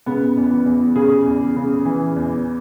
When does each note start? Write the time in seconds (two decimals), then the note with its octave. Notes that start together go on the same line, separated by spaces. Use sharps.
0.06 C#3 B3
0.37 E2
0.51 B3
0.66 E2
0.96 C#3 G#4
1.26 E2
1.56 C#3
1.85 E3
2.16 E2